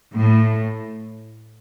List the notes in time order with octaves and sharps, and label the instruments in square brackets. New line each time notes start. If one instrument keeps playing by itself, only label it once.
[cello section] A2